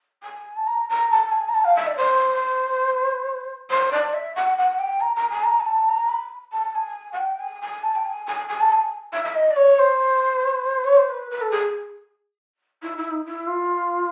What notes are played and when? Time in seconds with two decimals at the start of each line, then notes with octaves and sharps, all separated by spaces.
0.23 G#5
0.56 A5
0.67 A#5
0.89 A#5
1.10 A5
1.31 G#5
1.48 A#5
1.54 A5
1.64 F5
1.76 E5
1.86 D5
1.97 C5
3.70 C5
3.92 D5
4.13 E5
4.36 F#5
4.58 F#5
4.79 G5
5.00 A#5
5.16 A#5
5.30 G#5
5.43 A#5
5.60 G#5
5.66 A5
5.88 A#5
6.09 B5
6.52 A5
6.75 G#5
7.12 F#5
7.17 G5
7.39 G#5
7.62 G#5
7.83 A5
7.95 G5
8.05 G#5
8.27 G#5
8.48 G#5
8.61 A5
8.72 G#5
9.12 E5
9.24 E5
9.34 D#5
9.50 D5
9.56 C#5
9.79 C5
10.84 C#5
10.96 C5
11.09 B4
11.30 B4
11.41 A4
11.51 G#4
12.82 E4
12.97 E4
13.11 D#4
13.25 E4
13.47 F4